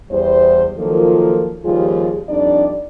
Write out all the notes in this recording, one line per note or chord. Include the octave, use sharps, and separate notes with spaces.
E2 G3 C5
D#3 F3 F#3 A#3 F4 A4
D#2 F3 G3 F4 G4 G#4
F2 G3 D4 D#4 D5